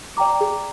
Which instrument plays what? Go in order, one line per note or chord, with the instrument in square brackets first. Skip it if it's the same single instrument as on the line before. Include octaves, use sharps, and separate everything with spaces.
[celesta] D5 G5 A#5 D6
G#4